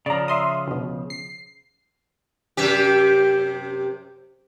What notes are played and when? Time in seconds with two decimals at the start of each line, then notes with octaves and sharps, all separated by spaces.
0.06 C#3 F3 D5 A#5
0.28 E5 C6 D#6
0.67 D2 B2
1.10 C7
2.57 F#2 C3 G4